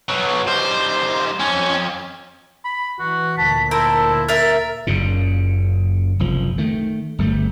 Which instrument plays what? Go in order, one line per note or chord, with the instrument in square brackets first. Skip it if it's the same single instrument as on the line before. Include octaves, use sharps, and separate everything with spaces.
[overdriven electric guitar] B2 F#3
[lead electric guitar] G3 D#4 [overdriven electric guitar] C5
[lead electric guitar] F2 [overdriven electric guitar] C#4
[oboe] B5
[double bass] E3 [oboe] F#4
[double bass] D2 A#2 [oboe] A5 [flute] B6
[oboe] E4 [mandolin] A#4 C5 [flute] A5
[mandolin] A#4 E5 [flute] A6
[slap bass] F#1 F#2 A#2 C#3
F#1 C2 F3
D#3 A3
G1 G3 A3